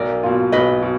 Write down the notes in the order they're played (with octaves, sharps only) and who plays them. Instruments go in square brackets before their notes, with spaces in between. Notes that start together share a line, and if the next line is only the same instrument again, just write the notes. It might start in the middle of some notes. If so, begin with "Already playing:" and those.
Already playing: [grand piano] B1 [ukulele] A#4 D5
[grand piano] B2 A#3 F4
[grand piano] B1 [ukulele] B4 D#5
[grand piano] B2